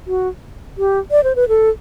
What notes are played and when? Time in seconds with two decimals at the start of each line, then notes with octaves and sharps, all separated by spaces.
0.07 F#4
0.78 G4
1.11 D5
1.24 C5
1.36 B4
1.49 A4